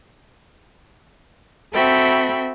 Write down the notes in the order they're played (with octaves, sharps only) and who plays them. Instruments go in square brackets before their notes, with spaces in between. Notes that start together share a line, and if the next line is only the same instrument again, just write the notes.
[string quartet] C4 F#4 A4 E5 G5 B5